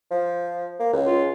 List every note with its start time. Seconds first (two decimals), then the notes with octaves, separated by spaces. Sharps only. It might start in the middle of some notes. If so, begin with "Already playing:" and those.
0.11 F3
0.80 A#3
0.93 C#2
1.06 F4